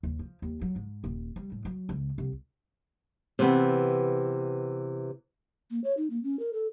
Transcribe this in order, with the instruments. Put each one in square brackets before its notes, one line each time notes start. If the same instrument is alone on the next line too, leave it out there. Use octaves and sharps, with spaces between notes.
[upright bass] D#2
F3
D#2
F#3
G#2
D#1
G3
A2
F#3
C#2
C2
[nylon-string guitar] C3 E3 B3
[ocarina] A#3
C#5
D#4
A#3
C#4
A#4
A4